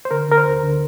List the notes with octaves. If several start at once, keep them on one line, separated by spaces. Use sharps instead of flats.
C5
D3 A#4
D3 A#4
C5
D2
D3